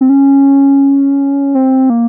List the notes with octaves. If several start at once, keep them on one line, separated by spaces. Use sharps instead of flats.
C4
C#4
C4
A#3